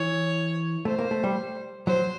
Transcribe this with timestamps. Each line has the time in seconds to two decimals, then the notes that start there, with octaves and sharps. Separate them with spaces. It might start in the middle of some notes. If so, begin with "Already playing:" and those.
Already playing: E3 C#5
0.85 A3 C5
0.99 A#3
1.11 A3
1.24 G3
1.87 F#3 C5